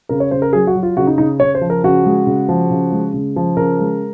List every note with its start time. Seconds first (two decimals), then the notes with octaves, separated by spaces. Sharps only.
0.09 C#3 A#4
0.20 C#5
0.31 C#3 C5
0.42 A#4
0.53 F#3 G#4
0.67 F#4
0.75 F#3
0.83 F4
0.97 C#3 F#4
1.07 D#4
1.18 C#3 D#4
1.40 C#3 C#5
1.55 C5
1.61 F3
1.70 A#4
1.84 C#3 F#4
2.06 G#3
2.27 C#3
2.49 F3
2.70 C#3
2.92 G#3
3.14 C#3
3.36 F3
3.57 C#3 A#4
3.80 G#3